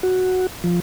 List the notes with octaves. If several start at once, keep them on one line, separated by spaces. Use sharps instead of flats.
F#4
F3